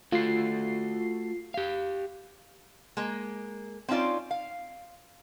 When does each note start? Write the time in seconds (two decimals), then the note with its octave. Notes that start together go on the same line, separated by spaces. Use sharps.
0.12 A3 F4 F#4 A4 C7
1.54 G4 F5
2.97 G#3 A#3
3.88 C4 C#4 D#4 F4 D5
4.31 F5